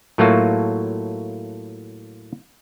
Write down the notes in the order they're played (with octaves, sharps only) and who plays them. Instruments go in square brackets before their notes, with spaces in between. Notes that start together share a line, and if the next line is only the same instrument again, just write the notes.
[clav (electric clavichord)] A2 F#3 A3 A#3 F4 F#4